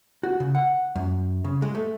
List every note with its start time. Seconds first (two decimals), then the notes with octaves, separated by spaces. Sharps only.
0.23 F#4
0.40 C#3
0.55 F#5
0.96 F#2
1.44 C#3
1.62 G#3
1.75 A3